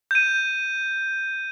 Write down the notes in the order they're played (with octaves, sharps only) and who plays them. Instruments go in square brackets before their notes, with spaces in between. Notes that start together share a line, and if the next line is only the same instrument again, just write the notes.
[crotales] G6 D#7